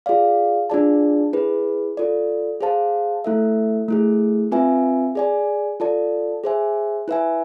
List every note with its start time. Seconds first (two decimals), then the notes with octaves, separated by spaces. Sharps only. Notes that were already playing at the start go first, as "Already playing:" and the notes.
0.06 F4 G#4 D5 F5
0.70 D4 F4 G#4 D5 A5
1.33 E4 G#4 B4
1.97 F4 A4 D5
2.61 G#4 C5 F5 A5
3.24 A3 E4 A4 E5
3.88 A3 E4 G#4
4.52 C4 F4 B4 E5 G#5
5.15 G#4 D5 G#5
5.80 F4 A4 D5 A5
6.44 G#4 C5 E5 G#5
7.08 E4 B4 E5 G#5